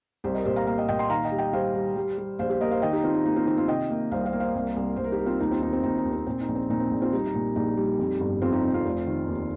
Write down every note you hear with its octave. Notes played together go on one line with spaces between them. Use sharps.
C2 G4 C5
A#4 D#5
A#2 G4 C5
F5 A#5
A#3 F5 A#5
D#5 G5
A#2 D#5 G5
G5 C6
D#3 F5 A#5
D#5 G5
G3
D#5 G5
G3 C5 F5
G3
G3
G3
A#1 C5 F5
G4 C5
A#3 A#4 D#5
C5 F5
D#3 D#5 G5
D#4 G4
D#3 C4 F4
D#4
A#3 D#4
C4 F4
D#3 C4 F4
C4 F4
C3 D#5 G5
A#3
C2 C5 F5
C5 F5
A#3
C5 F5
C2
C2
C2 C5
A#4
D#4 G4
G3
C4 F4
D#2 D#4
C4 F4
D#2 D#4
C4
D#2 D#4
D#4
D#2
C4
A#2 C4
D#4
A#1
C4
A#2 D#4
C4
A#1
C4 F4
G3 D#4
D#4
A#2
A#1 D#4
G3
F2
G1
F2 C4 F4
D#4 G4
C3 D#4
C4 F4
F1
D#3
D#2